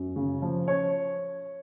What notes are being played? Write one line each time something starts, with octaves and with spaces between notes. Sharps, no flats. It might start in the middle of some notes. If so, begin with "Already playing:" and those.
Already playing: F#2
C#3
F3
C#5